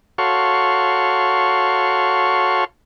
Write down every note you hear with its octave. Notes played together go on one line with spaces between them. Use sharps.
F#4 A4 C#5 F5 C6 C#6